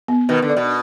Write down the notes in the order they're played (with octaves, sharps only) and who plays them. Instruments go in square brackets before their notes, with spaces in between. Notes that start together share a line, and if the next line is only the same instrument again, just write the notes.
[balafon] B3
[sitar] B2 D#3 [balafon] B4
[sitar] D3
[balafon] D5
[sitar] B2